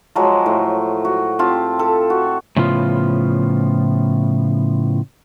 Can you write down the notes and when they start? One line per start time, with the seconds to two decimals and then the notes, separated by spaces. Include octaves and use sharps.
0.16 F3 F#3 G#3
0.46 A2
1.05 F#4
1.39 C4 F4 G4 A5
1.79 A4
2.10 F#4
2.57 A2 C#3 F3 B3 F4